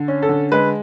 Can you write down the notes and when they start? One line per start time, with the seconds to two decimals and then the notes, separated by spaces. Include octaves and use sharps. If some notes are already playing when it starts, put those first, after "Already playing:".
Already playing: D3
0.08 C#4
0.23 A4
0.29 D3
0.52 G#3 B4